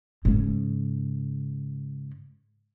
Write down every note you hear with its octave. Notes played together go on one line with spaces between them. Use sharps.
G#2 C#3